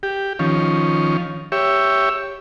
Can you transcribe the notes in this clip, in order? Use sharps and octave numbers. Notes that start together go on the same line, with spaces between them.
G4
D#3 F3 C#4
G4 C#5 E5